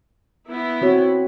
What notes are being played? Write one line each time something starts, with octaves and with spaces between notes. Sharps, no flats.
B3 E4
C4 F#4 C#5